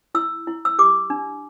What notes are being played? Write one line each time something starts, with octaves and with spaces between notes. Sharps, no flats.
E4 E6
E4
E6
G4 D6
D4